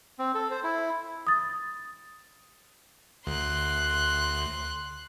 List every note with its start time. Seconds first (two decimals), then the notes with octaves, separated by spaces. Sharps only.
0.19 C4
0.35 A4
0.51 C5
0.64 E4
1.27 D#6 A6
3.27 D2 C6 F#6